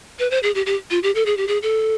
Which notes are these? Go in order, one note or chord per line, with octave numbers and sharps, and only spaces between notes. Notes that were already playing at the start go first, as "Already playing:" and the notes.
B4
C5
G#4
G4
G4
F4
G4
A4
G#4
G4
G#4
A4